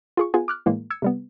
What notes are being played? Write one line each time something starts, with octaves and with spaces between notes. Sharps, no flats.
F4 G#4 C#6
B3 F4 G#4 F#5 G#5
D6 F6 F#6
A2 E3 G#3 A#3
E6 G#6 C#7
C3 G3 B3